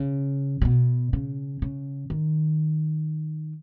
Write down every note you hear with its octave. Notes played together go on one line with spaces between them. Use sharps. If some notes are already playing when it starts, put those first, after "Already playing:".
Already playing: C#3
C#3
B2
C#3
C#3
D#3